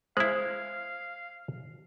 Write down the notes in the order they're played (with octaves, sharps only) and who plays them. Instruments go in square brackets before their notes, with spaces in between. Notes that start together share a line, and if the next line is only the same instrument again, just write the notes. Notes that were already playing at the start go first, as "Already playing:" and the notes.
[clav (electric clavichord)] G#3 E4 [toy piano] C5 [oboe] F5